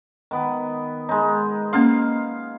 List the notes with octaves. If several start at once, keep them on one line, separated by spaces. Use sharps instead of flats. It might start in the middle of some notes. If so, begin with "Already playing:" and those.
D#3 B3
G#3 D#4
A#3 C#4 F5 C6